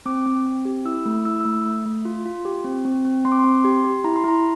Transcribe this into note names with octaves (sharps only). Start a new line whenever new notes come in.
C4 D6
C4
C4
G4
E4 E6
A3
E4 E6
E6
A3
A3
A3
F4
F4
G4
C4
C4
C4
C4 C6
D6
C6
C4
G4 C6
G4
E4 A#5
C6
E4 A#5